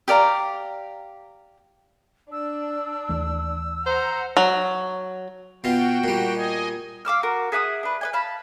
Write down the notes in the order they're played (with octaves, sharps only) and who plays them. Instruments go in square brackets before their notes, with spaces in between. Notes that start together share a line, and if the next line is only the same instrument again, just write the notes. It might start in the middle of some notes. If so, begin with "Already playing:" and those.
[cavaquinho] G4 D5 F5 A#5
[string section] D4 [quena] E6
[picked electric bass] D#2 E3 A3
[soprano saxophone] C5 [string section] F#5 A#5
[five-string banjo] F#3
[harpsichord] B2 F4 [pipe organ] F#4 G5
[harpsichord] A#2 G3
[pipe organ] D#5 G#5
[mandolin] F5 D6 E6 F6
F#4 A#4
G#4 E5 F#5 D#6
D4 B4
B4 D#5 G#5
F5 A5 B5